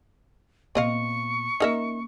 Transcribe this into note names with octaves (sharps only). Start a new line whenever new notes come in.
A#2 B3 C4 D#5 F5 C#6
A#3 C#4 D#4 A#4 E5